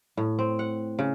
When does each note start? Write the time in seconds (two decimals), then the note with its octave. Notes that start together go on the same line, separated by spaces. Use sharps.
0.17 A2
0.39 C4
0.59 F#5
0.99 C#3